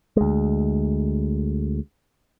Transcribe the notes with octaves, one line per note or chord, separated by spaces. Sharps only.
D2 G#3